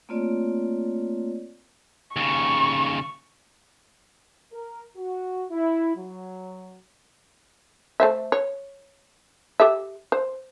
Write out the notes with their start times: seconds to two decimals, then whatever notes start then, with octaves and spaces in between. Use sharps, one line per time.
0.09 A3 A#3 C4 F4 C#5 D5
2.16 D#2 C#3 C#6
4.53 A#4
4.97 F#4
5.50 E4
5.96 F#3
8.00 A3 C5 E5
8.32 C#5
9.60 G4 A4 E5
10.12 C5